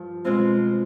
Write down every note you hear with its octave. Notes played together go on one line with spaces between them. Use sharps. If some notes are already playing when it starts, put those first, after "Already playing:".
Already playing: G2 F3
B2 G#3 C4 F4